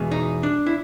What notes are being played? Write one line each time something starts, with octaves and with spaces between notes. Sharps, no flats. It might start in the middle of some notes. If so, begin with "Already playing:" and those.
Already playing: E2 B2 G#3
D#4
D4
E4